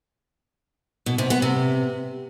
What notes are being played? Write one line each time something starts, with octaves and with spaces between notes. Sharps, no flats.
B2
C3
B3
C3